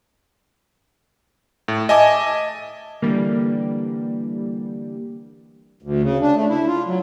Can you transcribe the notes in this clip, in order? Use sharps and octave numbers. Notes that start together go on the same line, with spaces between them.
A2
D#5 E5 G#5 A5 D6
D3 E3 G3 A#3
D2
C#3
D4
A3
E4
F4
F#3